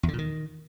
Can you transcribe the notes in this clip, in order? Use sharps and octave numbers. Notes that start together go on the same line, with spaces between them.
E2
D3
A#2
D#3